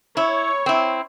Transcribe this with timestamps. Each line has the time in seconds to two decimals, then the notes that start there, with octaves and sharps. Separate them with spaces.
0.17 E4 C#5
0.66 C4 E4